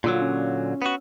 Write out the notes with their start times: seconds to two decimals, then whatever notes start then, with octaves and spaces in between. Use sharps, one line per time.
0.04 A#2 D3 F#3 F4 E6
0.21 C#4
0.82 B3 F#4